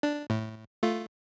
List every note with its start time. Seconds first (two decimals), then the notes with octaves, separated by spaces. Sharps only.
0.03 D4
0.30 A2
0.83 A3 F4